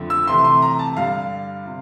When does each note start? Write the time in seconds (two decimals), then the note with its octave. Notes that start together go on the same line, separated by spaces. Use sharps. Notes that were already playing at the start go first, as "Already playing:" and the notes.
Already playing: F2 D3 A3
0.10 E6
0.27 C3 E3 A3 C6
0.44 C6
0.62 A#5
0.79 A5
0.97 G2 D3 G3 F5
1.66 C3